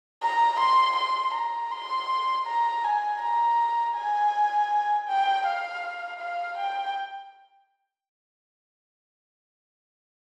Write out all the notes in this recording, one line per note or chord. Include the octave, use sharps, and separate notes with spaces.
A#5
C6
C6
A#5
C6
A#5
G#5
A#5
G#5
G5
F5
F5
G5